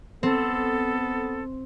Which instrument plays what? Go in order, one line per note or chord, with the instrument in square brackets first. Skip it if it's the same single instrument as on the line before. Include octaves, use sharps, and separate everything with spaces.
[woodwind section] B3 A4 [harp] C4